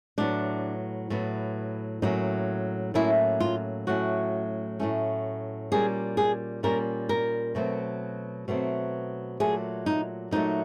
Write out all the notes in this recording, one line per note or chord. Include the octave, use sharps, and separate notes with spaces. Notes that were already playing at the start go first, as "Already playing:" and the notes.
A2 F#3 B3 D4
A2 F#3 B3
A2 F#3 A#3 C#4 D#4
A2 F#3 A#3 C#4 E4
F4
A2 F#3 A3 C#4 F#4
A2 F#3 A3 C#4
A#2 G3 A#3 C#4 G#4
G#4
A#2 G3 A#3 C#4 A#4
A#4
B2 F#3 A3 C4
B2 F#3 A3 C4
A#2 F#3 A3 G#4
D#4
A#2 F#3 A3 D#4